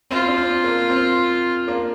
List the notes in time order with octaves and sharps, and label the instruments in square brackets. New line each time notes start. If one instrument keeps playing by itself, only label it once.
[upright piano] C4 [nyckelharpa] F4
[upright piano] D4
C4
A#3
C4
A#3 D4